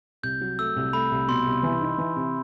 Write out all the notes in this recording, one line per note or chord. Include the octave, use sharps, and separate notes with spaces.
C2 G6
F#3
A3 E6
C2
A3 B5
C2
B2 C6
C2
E3
D#4
E3
C3